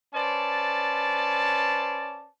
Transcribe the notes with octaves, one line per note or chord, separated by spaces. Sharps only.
C#4 B4 C5 D5 A5